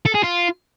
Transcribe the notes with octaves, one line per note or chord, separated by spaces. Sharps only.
A4
G#4
F4